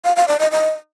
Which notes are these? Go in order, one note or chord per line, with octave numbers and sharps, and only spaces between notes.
F5
F5
D5
D#5
D#5